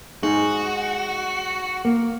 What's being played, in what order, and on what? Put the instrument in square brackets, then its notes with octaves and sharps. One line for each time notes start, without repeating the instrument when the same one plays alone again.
[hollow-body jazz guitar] G#3 D#4 G#4 [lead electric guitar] F#4
[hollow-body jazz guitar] A#3